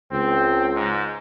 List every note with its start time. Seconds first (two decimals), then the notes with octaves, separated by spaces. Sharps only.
0.11 C#2 C4
0.74 G#2